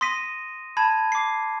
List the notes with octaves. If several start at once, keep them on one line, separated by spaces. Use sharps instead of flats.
C6 D#6 A#6 B6 D#7
A5 B5 G#6 D#7
D6 C7